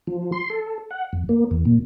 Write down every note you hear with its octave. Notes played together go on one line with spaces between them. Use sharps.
F3
C6
A4
F#5
F2
A#3
E2
A#2